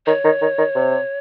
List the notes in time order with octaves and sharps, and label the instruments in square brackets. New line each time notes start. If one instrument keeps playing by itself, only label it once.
[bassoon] D#3 [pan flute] C#5
[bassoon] D#3
D#3
D#3
C3